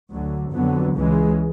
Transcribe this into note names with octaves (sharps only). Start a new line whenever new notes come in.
D2 D3 F#3
F2 D3 F#3 B3
C#2 C#3 E3 G#3